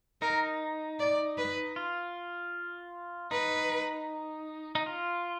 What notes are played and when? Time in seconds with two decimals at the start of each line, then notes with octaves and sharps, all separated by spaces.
0.22 D#4 A#4
0.99 D5
1.38 B4
1.76 F4
3.31 D#4 B4
4.75 D#4
4.86 F4